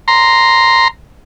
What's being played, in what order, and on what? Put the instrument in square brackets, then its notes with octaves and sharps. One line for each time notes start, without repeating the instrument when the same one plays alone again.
[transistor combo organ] A#5 C6